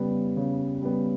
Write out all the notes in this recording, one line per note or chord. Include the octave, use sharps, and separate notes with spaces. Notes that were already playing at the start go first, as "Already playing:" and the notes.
Already playing: C#3 G3 B3
C#3
G3 B3